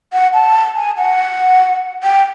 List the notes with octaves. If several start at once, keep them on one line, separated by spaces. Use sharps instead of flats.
F#5
A5
G#5
F#5
G5